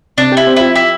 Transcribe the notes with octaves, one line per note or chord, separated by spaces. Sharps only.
C3 D4
E4 G4
C4
F3 E4
E4 G4